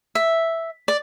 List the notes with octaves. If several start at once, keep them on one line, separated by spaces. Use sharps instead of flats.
E5
D5